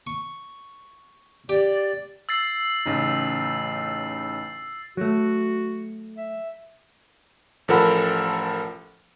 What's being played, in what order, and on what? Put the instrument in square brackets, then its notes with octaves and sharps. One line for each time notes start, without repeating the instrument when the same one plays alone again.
[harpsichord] C#6
[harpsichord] G4 [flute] D5
[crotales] E6 A6 C7
[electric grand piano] A1 C#3 D#4
[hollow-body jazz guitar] F#3 A3 [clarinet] F#4
[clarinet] E5
[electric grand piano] A1 F3 A4 A#4 F#5 B5